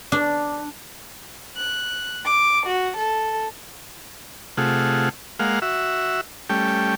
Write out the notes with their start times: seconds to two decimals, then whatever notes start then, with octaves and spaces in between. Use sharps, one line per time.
0.12 D4
1.56 F#6
2.24 D6
2.67 F#4
2.97 A4
4.57 C3 A3 F4 G#4 F#5
5.39 G#3 A#3 F5 F#5
5.62 F#4 E5
6.50 G3 A3 C#4 G5